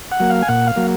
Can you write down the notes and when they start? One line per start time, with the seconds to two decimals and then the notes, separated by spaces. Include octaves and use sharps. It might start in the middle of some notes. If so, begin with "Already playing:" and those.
0.12 F#5
0.20 F#3 A#3
0.30 F5
0.42 G#5
0.48 A#2 F#5
0.67 F5
0.76 F#3 A#3